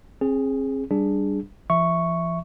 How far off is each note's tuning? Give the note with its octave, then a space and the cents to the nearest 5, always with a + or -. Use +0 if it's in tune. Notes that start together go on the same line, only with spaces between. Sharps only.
C4 +40 G#4 +0
G3 +0 D4 +0 G#4 +0
F3 -45 E5 +0 C#6 +0